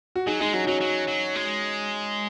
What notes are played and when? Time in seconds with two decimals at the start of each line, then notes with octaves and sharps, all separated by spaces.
0.16 F#4
0.27 F#3 D#4 G#4
0.40 G#3 D#4 G#4
0.53 F#3 C#4 F#4
0.63 D#4
0.67 F#3 C#4 F#4
0.80 F#3 C#4
1.07 F#3
1.36 G#3